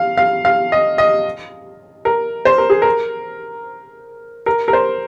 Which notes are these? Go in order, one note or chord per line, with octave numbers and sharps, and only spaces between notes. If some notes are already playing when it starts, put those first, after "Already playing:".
Already playing: F5
F5
F5
D#5
D#5
A#4
C5
A#4
G#4
A#4
A#4
A#4
C5